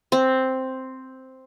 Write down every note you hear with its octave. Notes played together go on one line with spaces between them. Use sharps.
C4